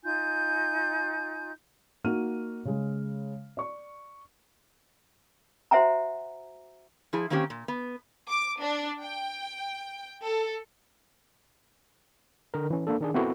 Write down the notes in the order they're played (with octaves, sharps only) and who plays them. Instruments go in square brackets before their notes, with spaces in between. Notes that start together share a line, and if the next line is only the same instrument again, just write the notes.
[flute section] D#4 F4 G#5 G6
[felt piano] A#3 D#4 F#4 F6 D#7
C#3 G#3
D5 C#6
[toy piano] F#4 C5 E5 F#5 G#5 A#5
[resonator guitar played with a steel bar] F3 E4 G#4
D#3 A#3 C4 C#4 G4
A#2
B3
[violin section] D6
D4
G5
A4
[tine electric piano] D3 A#4
E3 C#4
A#3 D4 A4
D#3 D4 G#4
B3 C4 E4 F#4 A4 A#4